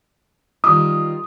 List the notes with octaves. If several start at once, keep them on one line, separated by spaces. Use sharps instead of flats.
D#3 G3 F4 D#6